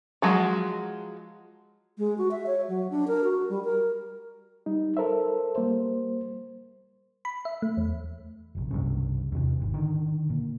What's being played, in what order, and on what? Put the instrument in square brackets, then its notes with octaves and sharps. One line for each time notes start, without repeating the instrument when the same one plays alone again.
[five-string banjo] F3 F#3 G#3 F#4
[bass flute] G#3
F#4
E5
C#5
F#3
D4
A#4
F#4
G3
A#4
[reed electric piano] G3 D#4
A4 A#4 C5 E5
G3 A#3 C5
[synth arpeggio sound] B5
E5
A3
E2
[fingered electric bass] F1 A#1
C2 G2 C#3
E2 C3 D#3 E3
G#1
D3 D#3
A#2